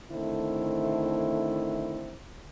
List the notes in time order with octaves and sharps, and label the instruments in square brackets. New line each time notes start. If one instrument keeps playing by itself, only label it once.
[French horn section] D3 D#3 A3 C4 E4